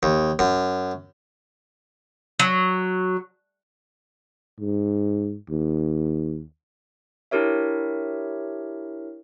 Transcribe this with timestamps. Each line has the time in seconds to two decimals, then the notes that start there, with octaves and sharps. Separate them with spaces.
0.03 D#2
0.39 F#2
2.40 F#3
4.60 G#2
5.50 D#2
7.31 D4 E4 G4 A#4 C#5 E5